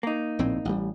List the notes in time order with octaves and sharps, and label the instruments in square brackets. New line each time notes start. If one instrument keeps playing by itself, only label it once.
[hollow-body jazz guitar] A#3 D#4
[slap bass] A#1 A2 C4
A1 G3